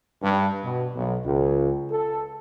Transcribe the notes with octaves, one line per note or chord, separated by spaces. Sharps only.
G2
B2
B1
C#2
A4